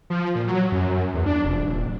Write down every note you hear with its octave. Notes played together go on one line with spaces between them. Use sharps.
F3
A#2
F#3
F#2
E2
D4
F1
D#1